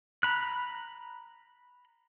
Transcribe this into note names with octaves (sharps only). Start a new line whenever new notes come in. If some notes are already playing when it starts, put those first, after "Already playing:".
A#5 B5 F#6